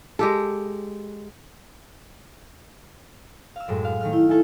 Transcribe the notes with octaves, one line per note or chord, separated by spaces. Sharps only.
G#3 G4 A4
F5 E6
F#2 A2 G#3
F5
D#3 A3 F6
E4
A4 E5 G#5